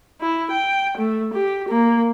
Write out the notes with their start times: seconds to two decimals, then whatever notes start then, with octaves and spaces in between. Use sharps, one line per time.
0.20 E4
0.51 G5
0.98 A3
1.34 G4
1.69 A#3